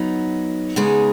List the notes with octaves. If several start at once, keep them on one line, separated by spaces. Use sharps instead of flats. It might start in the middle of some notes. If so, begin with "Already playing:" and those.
Already playing: F#3 B3 D#4
C#3 G#3 B3 D#4 G#4